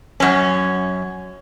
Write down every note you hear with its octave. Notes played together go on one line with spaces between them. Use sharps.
F#2 C#4